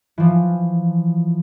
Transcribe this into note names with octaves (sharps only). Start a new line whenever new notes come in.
E3 F3